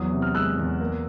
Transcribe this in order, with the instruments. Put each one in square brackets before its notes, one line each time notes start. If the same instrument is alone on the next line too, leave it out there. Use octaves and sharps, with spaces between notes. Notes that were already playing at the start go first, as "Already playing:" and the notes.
Already playing: [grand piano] E2 F#3 D#6
C3
F6
G#3 E6 F#6
E2
A#3